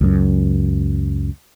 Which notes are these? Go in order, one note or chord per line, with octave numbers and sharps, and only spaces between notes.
C#2 F#2